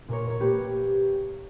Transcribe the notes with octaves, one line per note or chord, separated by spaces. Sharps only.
A#2 A#4 C#5
C#5
A#3 G4 B4